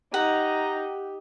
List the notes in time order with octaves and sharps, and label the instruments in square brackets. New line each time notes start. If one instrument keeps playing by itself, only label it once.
[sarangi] D#4 [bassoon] G4 [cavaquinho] F#5 [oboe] A#5